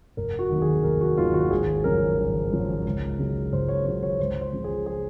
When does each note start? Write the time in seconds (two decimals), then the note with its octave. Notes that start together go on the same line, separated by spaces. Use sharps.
0.17 F1 A#4
0.39 F#4
0.50 D#2 D#3 F#3
0.62 G#4
0.83 F1 A#4
1.01 F#4
1.17 D#2 D#3 F#3 F4
1.34 F#4
1.51 G#1 G#4
1.84 F#2 C#3 F3 A#4
2.19 G#1
2.52 F#2 C#3 F3
2.85 C#2
3.19 C#3 F#3
3.53 C#2 C5
3.68 C#5
3.85 C#3 F#3 C#5
4.03 C#5
4.20 C#2 C5
4.41 C5
4.53 C#3 F3
4.64 G#4
4.86 G#4